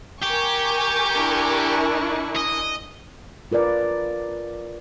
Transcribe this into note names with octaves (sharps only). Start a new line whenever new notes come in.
G4 A#4 G#5 C#6
D4 E4
D#5
F4 A#4 B4 D5